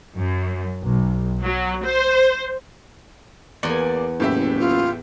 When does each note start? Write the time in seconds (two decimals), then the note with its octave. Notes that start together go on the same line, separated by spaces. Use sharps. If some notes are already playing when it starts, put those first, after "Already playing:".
0.17 F#2
0.82 B1
1.43 F#3
1.85 C5
3.63 E2 A#3 D5 G#5
4.20 F#1 A2 G4 E5
4.60 F4